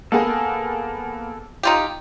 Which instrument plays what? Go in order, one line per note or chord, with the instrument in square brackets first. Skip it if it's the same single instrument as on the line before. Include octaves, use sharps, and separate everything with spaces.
[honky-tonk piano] A#3 B3 G#4 [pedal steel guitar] A4
[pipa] D#4 F4 G4